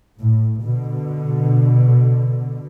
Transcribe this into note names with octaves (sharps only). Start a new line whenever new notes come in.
A2
B2 D3